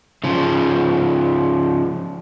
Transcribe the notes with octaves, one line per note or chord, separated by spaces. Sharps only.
C#3 F3